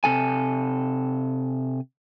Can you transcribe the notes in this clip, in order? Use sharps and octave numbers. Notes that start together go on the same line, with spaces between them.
C3 A4 G#5